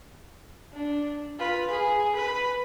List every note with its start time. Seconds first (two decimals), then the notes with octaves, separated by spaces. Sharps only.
0.73 D4
1.39 F4 B4
1.70 G#4
2.16 B4